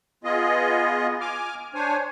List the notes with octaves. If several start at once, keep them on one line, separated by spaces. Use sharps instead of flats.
B3 F4 G#4 D#5
G#5 D6 F6
D4 C5 C#5 G#5